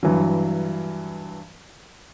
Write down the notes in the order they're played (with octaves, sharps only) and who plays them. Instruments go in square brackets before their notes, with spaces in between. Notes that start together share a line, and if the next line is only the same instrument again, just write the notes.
[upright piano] G2 E3 F#3